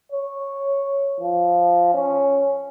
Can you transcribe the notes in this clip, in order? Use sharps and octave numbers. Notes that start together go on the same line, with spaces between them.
C#5
F3
C#4